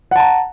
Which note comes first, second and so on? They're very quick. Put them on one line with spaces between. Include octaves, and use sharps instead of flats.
F#5 A5 A#5